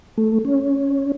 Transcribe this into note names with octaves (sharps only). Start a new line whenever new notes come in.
A3
C#4